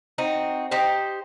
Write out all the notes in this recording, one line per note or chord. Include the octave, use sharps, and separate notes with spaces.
C4 D#4 F#4
D#4 G4 C5